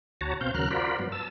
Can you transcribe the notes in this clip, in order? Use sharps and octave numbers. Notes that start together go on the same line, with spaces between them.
D2 F#4 C#5 A5 A#5
B2 C4 F5 G6
D#2 C#3 F#3 A#4 F6 F#6
F4 F#4 A#4 C5 D5 B5
G2 F#3 B3
A5 E6